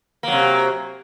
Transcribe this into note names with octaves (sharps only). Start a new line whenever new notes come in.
C3 F#3 A#3